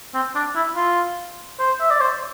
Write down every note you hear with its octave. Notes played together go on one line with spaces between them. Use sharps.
C4
D4
E4
F4
C5
E5
D5
C5